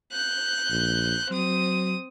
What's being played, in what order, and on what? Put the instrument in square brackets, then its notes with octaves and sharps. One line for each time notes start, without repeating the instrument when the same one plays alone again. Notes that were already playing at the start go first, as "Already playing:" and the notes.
[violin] F#6 G6
[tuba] A#1
[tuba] F#3 [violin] C4 D#6